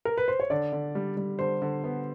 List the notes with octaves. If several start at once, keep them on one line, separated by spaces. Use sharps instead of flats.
A#4
B4
C5
C#5
D3 D5
D3
G3
G3
D3 C5
D3
B3